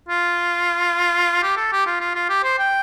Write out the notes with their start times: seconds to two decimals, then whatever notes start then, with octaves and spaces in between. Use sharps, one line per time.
0.09 F4
1.43 G4
1.57 A4
1.73 G4
1.87 F4
2.01 F4
2.15 F4
2.30 G4
2.44 C5
2.59 G5